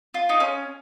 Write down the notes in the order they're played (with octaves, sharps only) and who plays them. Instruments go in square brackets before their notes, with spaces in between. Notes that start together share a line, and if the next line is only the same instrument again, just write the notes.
[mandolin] F4
D#4
C#4